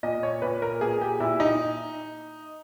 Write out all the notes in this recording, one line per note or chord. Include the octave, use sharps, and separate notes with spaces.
A#2 D#5
C#5
A#2 B4
A#4
A#2 G#4
G4
A#2 E4
D#4